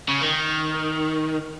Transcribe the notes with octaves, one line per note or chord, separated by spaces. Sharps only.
C#3
D#3